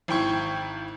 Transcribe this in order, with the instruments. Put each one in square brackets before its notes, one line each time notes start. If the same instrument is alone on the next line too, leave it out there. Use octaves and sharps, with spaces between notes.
[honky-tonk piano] G#1 E4 G5 C#6 G#6